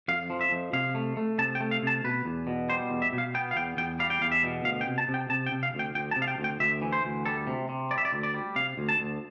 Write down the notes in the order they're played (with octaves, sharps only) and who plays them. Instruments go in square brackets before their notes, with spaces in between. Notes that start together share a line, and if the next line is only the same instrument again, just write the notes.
[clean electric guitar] F2 F5
F3
E5
F2
C3 F5
A3
A3
C3 A5
G5
A3
F5
C3 A5
B2 B4
E2
B2
G3 C5
E2
E5
B2
F5
B3 G5
F5
E2 G5
E2 G5
G3 F5
G5
E2 F5
E5
B2
D2 F5
G5
C3
A5
C3
G5
C3 A5
G5
C3
F5
D2
G5
D2 G5
A5
C3
F5
G5
D2
G5
D2 E5
E3
C5
D2
G3 A4
C3
C3
G3 D5
E5
D5
D2
D5
G3
C3 F5
D2
A5
D2